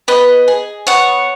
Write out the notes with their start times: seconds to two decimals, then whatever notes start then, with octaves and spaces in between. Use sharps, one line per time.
0.08 B3 B4 D#5
0.48 G#4
0.87 B3 C#5 F#5